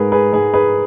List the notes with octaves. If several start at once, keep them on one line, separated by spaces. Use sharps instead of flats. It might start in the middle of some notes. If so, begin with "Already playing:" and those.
Already playing: G#2 G#3 G#4 A#4 B4
G#4 B4
G#2 G#4 B4
G#4 B4